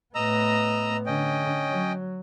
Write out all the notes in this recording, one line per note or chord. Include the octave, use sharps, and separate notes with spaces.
A2 B3 D#5 A#5 E6
D3 C#4 D#5 G5
F#3